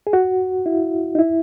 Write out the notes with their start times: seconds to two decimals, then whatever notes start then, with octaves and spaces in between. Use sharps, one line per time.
0.07 G#4
0.13 F#4
0.66 E4
1.15 D#4
1.19 E4